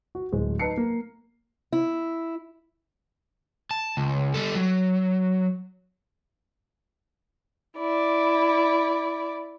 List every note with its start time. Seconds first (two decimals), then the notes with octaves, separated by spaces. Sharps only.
0.15 F#4
0.32 D1 G#3 C5
0.59 D#4 B4 A5 C7 C#7
0.77 A#3
1.72 E4
3.71 A5
3.97 C#2
4.34 G3 A4
4.55 F#3
7.78 E4 D5